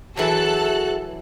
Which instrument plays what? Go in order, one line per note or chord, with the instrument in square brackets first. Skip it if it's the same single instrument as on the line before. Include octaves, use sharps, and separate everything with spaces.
[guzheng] E3 F#3 [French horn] F#4 [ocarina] G#4 [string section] A4 F#6